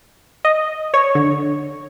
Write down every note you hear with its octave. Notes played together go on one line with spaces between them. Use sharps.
D#5
C#5
D3